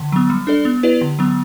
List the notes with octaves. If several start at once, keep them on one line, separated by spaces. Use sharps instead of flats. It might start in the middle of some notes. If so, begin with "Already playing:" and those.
Already playing: D3
F#3 B3
G3
D4 A4 D5
B3
E4 G4 B4 D5
D3
F#3 B3